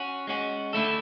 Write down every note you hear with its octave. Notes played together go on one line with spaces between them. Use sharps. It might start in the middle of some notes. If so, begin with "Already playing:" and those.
Already playing: C#4 F#4
G#3 C#4 F#4
D3 A3 E4 A4